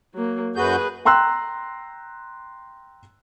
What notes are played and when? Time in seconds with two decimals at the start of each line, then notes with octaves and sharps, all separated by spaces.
0.15 F#3 A#3
0.56 F#2 F#4 G#4 B4 G6
1.05 G5 A#5 C6 E6 F#6